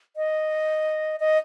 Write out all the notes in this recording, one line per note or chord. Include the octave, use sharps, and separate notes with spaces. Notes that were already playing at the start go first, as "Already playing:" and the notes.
D#5
D#5